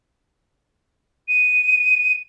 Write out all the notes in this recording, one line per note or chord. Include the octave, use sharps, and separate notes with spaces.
D#7